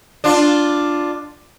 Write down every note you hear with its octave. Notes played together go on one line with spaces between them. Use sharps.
D4 F4